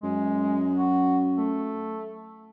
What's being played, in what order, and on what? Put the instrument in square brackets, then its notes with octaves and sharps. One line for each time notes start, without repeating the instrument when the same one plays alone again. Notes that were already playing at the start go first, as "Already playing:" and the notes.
[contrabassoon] F#2 [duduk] G#3
[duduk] F#4
A3